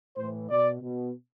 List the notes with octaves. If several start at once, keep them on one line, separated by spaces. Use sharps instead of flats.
A2 E3 C5
B2 D5
B2